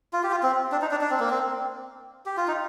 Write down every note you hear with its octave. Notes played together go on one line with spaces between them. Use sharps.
F4
G4
F4
C4
D4
D#4
D4
D4
C4
A#3
C4
G4
F4
D#4